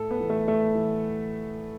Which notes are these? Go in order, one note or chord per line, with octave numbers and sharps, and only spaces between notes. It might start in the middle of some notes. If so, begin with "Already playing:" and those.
Already playing: A2 A4
B3
E3
A3
A2 A3
E3